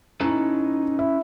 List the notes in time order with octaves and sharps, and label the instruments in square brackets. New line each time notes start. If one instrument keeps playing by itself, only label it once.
[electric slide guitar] C#4 A4 B4 [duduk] D#4 [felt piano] E4 A#5
[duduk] E4 [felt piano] E5